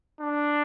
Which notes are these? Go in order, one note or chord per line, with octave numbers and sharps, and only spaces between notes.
D4